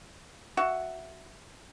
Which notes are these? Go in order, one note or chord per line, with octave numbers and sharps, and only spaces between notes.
F#4 E5 F#5